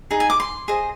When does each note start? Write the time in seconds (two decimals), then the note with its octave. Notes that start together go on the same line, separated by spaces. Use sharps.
0.11 D#4 G#4
0.20 G#5
0.30 D6
0.40 C6
0.68 G#4 C5 D#5